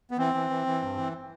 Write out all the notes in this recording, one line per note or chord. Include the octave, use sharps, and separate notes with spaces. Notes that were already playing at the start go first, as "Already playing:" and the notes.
B3
E3 C4
E3
E3
E3
G2
E3